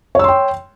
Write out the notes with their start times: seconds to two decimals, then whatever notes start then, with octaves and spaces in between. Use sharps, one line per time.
0.15 C#5
0.19 E6
0.24 C6
0.28 G5